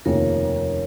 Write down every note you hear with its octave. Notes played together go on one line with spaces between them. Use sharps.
F1 D#2 C#3 F3 A#4 C#5